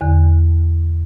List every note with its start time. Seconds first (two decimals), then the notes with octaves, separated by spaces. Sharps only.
0.01 E2 D3